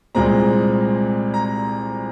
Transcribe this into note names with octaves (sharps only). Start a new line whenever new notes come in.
C2 A#2 G#3 C4 A#5
A#5